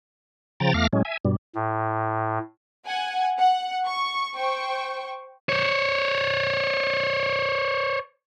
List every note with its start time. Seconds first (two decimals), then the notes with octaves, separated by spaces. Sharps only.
0.60 C#3 F3 G5 A#5 A6
0.74 E2 A3 F5 D6 F6 A#6
0.93 A2 F#3 G#3 C#4
1.05 E5 G#5
1.25 G2 B2 G3
1.55 A2
2.87 F#5 G#5
3.38 F#5
3.87 C#6
4.36 C5 G5 C#6
5.49 C5 C#5